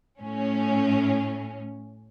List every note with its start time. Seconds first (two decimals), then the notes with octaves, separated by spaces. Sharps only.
0.19 A2 C#4